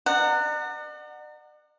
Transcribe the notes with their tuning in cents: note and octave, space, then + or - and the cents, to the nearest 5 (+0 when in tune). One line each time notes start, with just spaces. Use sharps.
D5 +45 F#5 +0 A#5 -30